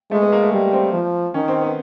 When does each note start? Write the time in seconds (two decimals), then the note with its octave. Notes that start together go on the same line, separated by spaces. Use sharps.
0.11 G#3 A3
0.22 B3
0.32 A#3
0.42 A3
0.52 G3 G#3
0.73 C4
0.93 F3
1.34 D#3 C#4
1.48 C4
1.61 B3